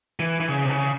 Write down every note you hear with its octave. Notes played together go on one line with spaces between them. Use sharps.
E3
E3
C#3
C3
C#3